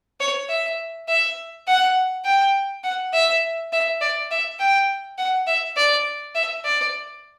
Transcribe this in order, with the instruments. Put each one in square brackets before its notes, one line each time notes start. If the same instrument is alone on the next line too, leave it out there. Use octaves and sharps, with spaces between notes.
[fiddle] C#5
E5
E5
F#5
G5
F#5
E5
E5
D5
E5
G5
F#5
E5
D5
E5
D5